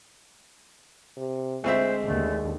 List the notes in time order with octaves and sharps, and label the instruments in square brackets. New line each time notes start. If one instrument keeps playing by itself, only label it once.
[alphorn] C3
[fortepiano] D2 C4 E5 [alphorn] G#3 [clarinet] C5
[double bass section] D#2 D3 [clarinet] A3